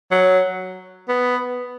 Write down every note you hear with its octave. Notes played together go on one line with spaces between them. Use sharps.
F#3
B3